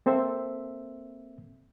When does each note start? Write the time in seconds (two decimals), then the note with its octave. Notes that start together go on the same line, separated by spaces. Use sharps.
0.06 A#3 C4 A4 C5 E5